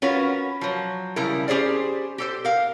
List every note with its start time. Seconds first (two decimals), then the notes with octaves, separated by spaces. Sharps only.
0.02 C#4 F4 F#4 A#4 B4
0.61 F3 F#3
1.16 C#3 F3 G3 E4 A#4
1.48 C#4 G4 G#4 C5 D5
2.18 G4 A4 C5
2.45 A#4 F5